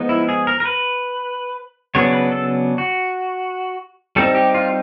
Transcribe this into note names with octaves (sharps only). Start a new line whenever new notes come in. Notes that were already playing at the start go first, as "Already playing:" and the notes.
Already playing: F3 G#3 B3 D#4
E4
G#4
A#4
A#4
B4
C#3 F#3 B3 D4 C#5
B4
A4
F#4
G3 C4 D#4 A4
G4
F4